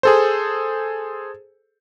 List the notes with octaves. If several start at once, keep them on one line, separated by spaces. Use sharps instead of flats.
G#4 A4 C5